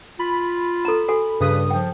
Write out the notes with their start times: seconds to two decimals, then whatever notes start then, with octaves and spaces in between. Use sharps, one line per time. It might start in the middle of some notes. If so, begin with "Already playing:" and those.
0.19 F4 B5
0.85 A4 A#5
1.08 F#4 A4 G#5
1.40 G2 C#3 B4 D#6
1.71 F3 G5